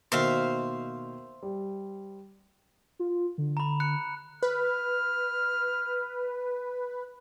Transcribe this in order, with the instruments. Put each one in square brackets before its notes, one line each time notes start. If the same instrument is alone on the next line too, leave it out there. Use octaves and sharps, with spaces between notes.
[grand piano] B2 D#3 A#3 [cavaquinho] C5 E5 F5
[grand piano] G3
[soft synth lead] F4
D3
[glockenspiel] A#5 B5
F#6 C#7
[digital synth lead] B4 [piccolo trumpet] F6